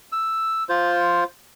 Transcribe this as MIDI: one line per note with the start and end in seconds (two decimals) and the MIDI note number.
0.12 0.63 88
0.69 1.24 65
0.69 1.24 72